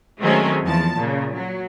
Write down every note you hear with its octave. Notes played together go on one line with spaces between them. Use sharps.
D#3 F#3 G#3 A3 C4 C#4
E2 F3 A5
A#2 C#3
F#3